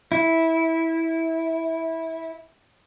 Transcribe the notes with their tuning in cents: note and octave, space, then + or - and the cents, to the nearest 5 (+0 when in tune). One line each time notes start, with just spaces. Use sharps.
E4 -15